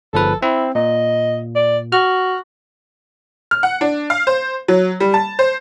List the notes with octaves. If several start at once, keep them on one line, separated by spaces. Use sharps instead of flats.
G1 F3 A4 B4
C4 E4
A#2 D#5
D5
F#4 F6
F6
F#5
D4
F5
C5
F#3
G3
A5
C5